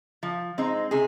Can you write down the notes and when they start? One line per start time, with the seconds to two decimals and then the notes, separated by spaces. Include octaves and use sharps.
0.23 F3
0.58 G#3 C4 D#4
0.91 C3 G#4